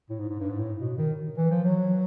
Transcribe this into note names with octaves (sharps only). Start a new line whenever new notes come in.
A2
G#2
G#2
G2
G#2
A2
B2
D#3
E3
F3
F#3